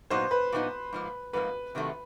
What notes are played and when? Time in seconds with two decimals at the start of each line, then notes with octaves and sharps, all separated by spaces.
0.10 A#2 F#3 B3 D#4 C5
0.31 B4
0.52 A#2 F#3 B3 D#4
0.93 G#2 F3 A#3
1.33 G#2 F3 A#3 B4
1.75 C3 D#3 F#3 A3